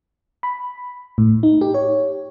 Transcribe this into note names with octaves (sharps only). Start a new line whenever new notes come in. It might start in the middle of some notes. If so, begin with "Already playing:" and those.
B5
A2
D#4
G4
C#5